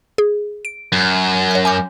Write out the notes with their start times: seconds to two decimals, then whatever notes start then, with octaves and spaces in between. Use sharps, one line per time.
0.18 G#4
0.65 D7
0.92 F#2
1.51 C#5 F#6
1.65 G#5 D6 G6